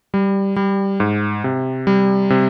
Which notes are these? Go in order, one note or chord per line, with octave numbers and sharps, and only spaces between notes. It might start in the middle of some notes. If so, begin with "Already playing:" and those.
G3
G3
G#2
C3
G3
C3